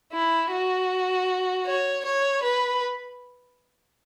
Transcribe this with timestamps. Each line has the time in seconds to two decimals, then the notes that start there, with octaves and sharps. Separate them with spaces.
0.13 E4
0.52 F#4
1.66 C#5
2.05 C#5
2.42 B4